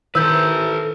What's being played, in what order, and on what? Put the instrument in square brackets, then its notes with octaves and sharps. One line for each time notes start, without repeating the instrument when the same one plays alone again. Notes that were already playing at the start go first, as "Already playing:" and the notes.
[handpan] D#3 C5 [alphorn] E4 [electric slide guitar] A4 B4 [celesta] E6 G6